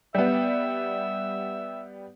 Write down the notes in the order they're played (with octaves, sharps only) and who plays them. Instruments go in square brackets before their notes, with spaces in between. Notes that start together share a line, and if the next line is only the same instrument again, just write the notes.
[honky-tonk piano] G3 B3 [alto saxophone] E5